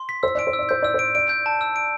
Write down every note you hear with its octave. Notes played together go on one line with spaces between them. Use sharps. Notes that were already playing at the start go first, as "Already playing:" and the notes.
Already playing: C6
B6
C5 E6
D5 D7
C5
E6
D5
C5 G6
D5 E6
C5
D7
D5 D7
G6
A5
E6
D7